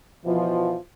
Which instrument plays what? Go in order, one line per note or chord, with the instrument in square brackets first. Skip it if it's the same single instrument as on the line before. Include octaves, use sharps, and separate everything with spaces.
[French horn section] B2 E3 F3